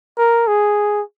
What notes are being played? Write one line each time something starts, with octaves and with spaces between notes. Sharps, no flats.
A#4
G#4